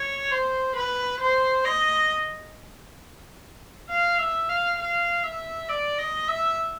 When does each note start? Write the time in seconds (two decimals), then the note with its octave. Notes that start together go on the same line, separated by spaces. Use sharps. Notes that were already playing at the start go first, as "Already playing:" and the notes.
Already playing: C#5
0.31 C5
0.76 B4
1.20 C5
1.65 D#5
3.89 F5
4.19 E5
4.49 F5
4.78 F5
5.23 E5
5.69 D5
5.98 D#5
6.28 E5